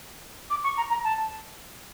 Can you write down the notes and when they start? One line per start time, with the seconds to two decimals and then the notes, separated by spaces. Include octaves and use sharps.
0.50 D6
0.64 C#6
0.77 A#5
0.90 A#5
1.04 A5